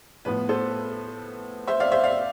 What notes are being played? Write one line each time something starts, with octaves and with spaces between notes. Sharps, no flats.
A2 F3 B3 B4
A4 C5
C5 E5
D5 F5
C5 E5
D5 F5